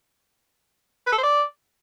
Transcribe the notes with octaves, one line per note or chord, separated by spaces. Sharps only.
B4
A4
C5
D5